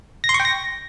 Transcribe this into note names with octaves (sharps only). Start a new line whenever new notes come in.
A#6
C6
C#6
G5
A#6